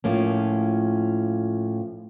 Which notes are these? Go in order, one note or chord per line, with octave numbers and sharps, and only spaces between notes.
A2 F3 A#3 C#4